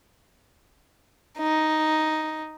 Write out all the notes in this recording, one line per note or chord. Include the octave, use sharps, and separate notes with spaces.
D#4